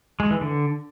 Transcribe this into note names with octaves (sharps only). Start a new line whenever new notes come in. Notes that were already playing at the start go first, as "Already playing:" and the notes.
G#3
E3
D3